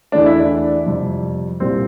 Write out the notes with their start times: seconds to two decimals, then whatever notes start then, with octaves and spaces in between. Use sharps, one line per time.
0.12 E2 E3 A3 D4
0.26 E4
0.39 D4
0.86 F2 C3 G3
1.60 C2 A#2 G3 C4